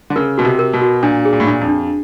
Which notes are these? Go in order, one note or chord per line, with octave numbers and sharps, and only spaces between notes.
D3
C#3 A#4
B2 F#4
C3
A#4
B2
F#4
A#2 D4
G#4
A#2
A2
A#2 D4
F2
D4